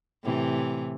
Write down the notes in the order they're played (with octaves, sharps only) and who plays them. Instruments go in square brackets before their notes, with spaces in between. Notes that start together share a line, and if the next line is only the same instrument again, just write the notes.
[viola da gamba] A2 C3 E3